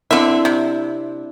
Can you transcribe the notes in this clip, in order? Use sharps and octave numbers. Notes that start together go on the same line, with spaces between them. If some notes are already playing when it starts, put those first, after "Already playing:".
D3 C4 D4 E4 E5
C3